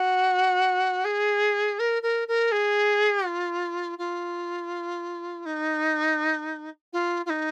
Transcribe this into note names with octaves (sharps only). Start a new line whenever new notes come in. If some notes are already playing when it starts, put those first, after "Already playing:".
Already playing: F#4
G#4
A#4
A#4
A#4
G#4
F4
F4
D#4
F4
F4
D#4